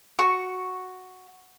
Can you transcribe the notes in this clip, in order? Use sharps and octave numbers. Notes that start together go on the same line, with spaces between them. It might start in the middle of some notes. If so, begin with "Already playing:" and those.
F#4 C#6